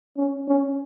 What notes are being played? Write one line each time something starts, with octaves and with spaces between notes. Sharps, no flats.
C#4
C#4